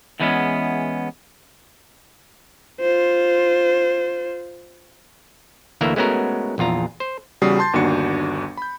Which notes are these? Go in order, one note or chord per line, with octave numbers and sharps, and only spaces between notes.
E2 E3 G3 G#3 B3 C#4
F4 C5
D2 E3 A3 A#3 E4 E5
G#3 A3 B3 C#4 F#4 A#4
A#1 E2 F4 A#5
C5
E2 C#3 G3 F#4 D#6 C7
A5 C6 G6 A6
G1 D#2 D4 F#4 C#7
B5 G6